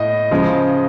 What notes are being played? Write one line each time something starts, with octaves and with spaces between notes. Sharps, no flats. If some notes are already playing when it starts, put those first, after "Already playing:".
Already playing: A2 D#5
C#3 F3 G#3